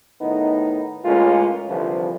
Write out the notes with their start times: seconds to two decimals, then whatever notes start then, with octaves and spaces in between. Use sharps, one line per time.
0.21 A2 D#3 B3 D#4
1.05 C#2 A2 G#3 A#3 C#4 F4
1.69 C2 D3 E3 F3